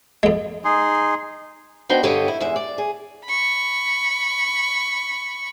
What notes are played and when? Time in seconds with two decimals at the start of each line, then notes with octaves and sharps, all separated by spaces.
0.23 F2 G#3
0.64 D#4 G#4 C6
1.89 B3 D4 F#4 C5 D#5 G5
2.03 G2 D3 G4 C#5 D#5
2.28 E4
2.40 E2 G#3 E5
2.56 D5
2.78 G#4
3.25 B5 C#6